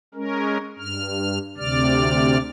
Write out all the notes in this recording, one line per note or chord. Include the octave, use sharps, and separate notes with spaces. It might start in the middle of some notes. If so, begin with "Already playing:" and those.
G#3 C#4 A#4
G2 F6
D2 C3 D5 F6